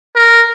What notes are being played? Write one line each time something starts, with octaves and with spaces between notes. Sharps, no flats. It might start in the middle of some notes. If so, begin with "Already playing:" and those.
A#4